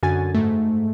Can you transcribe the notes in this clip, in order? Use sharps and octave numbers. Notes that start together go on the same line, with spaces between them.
F#2 D3 F#4 G#5 A6
G#2 A3